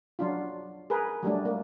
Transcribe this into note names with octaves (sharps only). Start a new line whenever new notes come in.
F#3 D4 F4
G#4 A#4 B4
F#3 G3 A3 D4
A#3